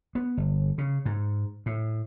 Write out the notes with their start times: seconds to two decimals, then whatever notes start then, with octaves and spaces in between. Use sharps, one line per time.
0.15 B3
0.37 G1
0.78 C#3
1.05 G#2
1.66 A2